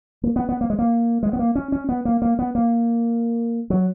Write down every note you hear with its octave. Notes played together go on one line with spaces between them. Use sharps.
A#3
B3
B3
A#3
G#3
A#3
G#3
B3
A#3
C#4
C#4
B3
A#3
A#3
B3
A#3
F#3